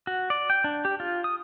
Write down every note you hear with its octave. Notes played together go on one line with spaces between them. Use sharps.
F#4
D5
G5
D4
G4
F4
D#6